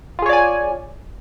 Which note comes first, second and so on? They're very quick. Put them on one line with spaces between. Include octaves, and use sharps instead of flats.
F4 G#4 C#5 D5 G#5